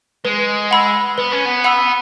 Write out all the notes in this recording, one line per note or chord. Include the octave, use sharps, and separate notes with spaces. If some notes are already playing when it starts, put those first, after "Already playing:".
G#3 B4
F#5 B5 E6
B3 B4
C#4
B3
F#5 B5 E6